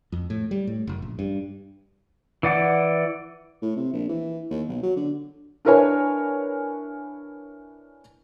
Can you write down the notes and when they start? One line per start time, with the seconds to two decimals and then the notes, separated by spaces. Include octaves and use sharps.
0.12 F2
0.30 A2
0.51 G3
0.67 A2
0.87 F#1
1.02 A#1
1.19 G2
2.43 E3 D5 F#5
3.62 A2
3.77 C3
3.93 A#1
4.09 E3
4.50 D#2
4.68 B1
4.83 F#3
4.96 D3
5.65 D4 E4 A#4 B4 C#5 G#5